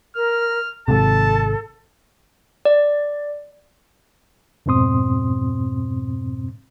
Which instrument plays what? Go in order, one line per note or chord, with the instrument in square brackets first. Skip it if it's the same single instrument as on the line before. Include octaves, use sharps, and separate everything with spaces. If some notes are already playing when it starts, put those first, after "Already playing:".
[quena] A#4 [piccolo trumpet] F6
[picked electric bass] G#1 G#2 C3 [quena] A4 [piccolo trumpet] A5
[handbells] D5
[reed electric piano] F2 G#2 B2 C4 C6 D#6